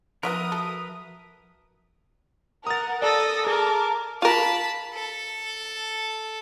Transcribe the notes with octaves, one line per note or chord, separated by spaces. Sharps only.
F3 B3 E4 F4 A#4 B4 E5 D#6
F#4 A4
A#4 F#5 D#6 A6
A4 D5 D#6 A#6
G#4 A#4 A5 D6
F4 A#4 A5 B5
A4